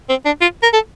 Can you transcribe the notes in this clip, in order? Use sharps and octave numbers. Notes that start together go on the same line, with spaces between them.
C4
D4
F4
A#4
A4